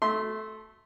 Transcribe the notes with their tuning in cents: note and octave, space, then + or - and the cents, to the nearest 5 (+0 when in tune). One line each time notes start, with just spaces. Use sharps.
A3 -10 E5 -30 C6 +0